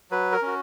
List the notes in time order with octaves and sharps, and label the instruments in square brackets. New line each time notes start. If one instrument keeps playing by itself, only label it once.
[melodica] F#3 B4
A#4
C#4 F#4